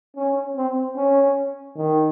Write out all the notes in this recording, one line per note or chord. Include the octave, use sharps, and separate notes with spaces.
C#4
C4
C#4
D#3